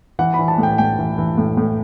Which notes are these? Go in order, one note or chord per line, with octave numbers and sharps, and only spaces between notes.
E3 F#5
B5
E3
A5
A2
G5
A2 G5
E3
E3
A2
A2